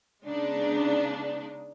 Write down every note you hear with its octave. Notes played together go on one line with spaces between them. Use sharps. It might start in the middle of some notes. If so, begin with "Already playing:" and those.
C#3 G#3 B3 D4 D#4